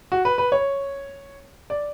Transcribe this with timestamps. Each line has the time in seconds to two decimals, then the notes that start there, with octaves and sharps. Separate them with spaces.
0.12 F#4
0.25 B4
0.38 B4
0.52 C#5
1.70 D5